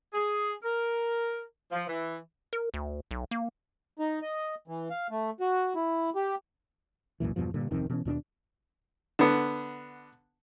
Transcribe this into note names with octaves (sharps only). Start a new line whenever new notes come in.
G#4
A#4
F3
E3
A#4
D2
B1
A#3
D#4
D#5
E3
F5
A3
F#4
E4
G4
C2 F#2 A#2 E3
E2 G2 B2 F3
G2 A#2 D3
D1 F2 C3 D#3
B2 E3 F3 C#4
D#2 B2 C#4 D4
D3 B3